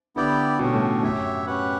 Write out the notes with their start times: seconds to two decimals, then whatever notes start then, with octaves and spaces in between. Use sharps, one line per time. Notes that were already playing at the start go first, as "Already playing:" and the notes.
0.16 D3 B3 E4 G4 D5 G5
0.59 B2 A3 C#4 G4
0.73 A2
1.02 F#2 G4 C#5 E5
1.47 C#4 G4 B4 F#5